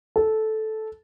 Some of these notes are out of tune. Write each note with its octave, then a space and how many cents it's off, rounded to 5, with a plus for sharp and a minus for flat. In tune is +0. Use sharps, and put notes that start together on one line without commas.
A4 -10